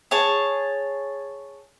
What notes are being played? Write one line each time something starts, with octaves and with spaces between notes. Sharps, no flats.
G#4 C#5 A5